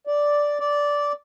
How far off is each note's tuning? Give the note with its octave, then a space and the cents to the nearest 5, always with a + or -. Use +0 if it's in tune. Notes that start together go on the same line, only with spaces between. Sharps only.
D5 -5
D5 -10